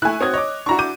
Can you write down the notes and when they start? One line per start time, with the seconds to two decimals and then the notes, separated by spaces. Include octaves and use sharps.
0.02 A3 E4 G#5 F#6
0.21 C4 F#4 C#5 D#6 G#6
0.34 C#5 D#5 D6
0.66 D4 E4 F#4 A#5 C#6
0.79 D6 G6 D#7